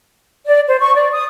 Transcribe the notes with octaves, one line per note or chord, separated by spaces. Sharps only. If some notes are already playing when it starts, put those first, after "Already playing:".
D5
C5
C#6
D5
D#6